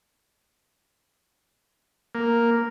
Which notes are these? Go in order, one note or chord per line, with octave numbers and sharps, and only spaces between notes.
A#3